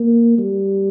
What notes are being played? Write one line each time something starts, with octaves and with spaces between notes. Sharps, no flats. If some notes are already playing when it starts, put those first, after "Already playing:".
Already playing: A#3
G3